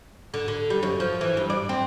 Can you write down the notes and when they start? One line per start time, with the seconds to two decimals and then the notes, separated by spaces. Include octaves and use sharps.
0.34 D3
0.48 D3
0.70 G3
0.83 F#2
1.00 F3
1.21 E3
1.37 G2
1.50 D5
1.69 C4